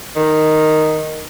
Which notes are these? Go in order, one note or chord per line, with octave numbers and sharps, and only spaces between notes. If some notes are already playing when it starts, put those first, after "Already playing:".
D#3